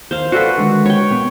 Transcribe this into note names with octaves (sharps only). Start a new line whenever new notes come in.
D#2 C5 F5
F#4 A4 B4 D5 F5
D3 D#3 G#3
C#5 G5
A#2 B3